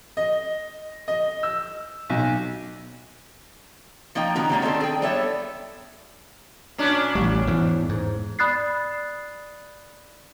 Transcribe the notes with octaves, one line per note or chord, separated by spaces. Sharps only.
D#5
D#5
E6
B1
F3 A#3 D#4 D#5 G5
D#3 B3 C#4 F#4 A#5
B2 G3 A3 A#3 C#4
D#3 C4 D4 A4 C5
G#4 G5
G3 B3 A4 C#5 E5
A#2 C#4 D4
A1 G3
E2 G#2 E3
G#2
D5 B5 D#6 F#6 A6 C7